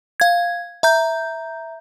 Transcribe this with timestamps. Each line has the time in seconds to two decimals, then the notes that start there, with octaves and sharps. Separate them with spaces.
0.20 F5 G#6
0.83 E5 A#5 G6